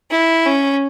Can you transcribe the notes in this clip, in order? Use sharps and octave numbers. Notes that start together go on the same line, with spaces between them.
E4
C#4